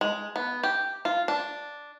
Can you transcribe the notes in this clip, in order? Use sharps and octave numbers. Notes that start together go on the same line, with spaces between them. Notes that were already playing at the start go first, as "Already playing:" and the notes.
G#3
B3
G4
F4
D4